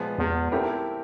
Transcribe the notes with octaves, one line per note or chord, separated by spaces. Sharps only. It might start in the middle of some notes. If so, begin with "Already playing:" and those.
Already playing: A#2 F3 G#3 B3
E2
A3 C4 E4 G4 A#4